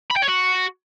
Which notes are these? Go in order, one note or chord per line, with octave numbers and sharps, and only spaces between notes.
B5
G5
C#5
F#4